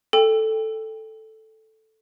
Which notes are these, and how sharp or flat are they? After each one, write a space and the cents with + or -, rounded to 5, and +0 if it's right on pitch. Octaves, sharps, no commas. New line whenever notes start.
A4 +0 G5 +20